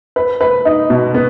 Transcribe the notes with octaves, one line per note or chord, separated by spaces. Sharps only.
B4
B4
D#4
B2
B3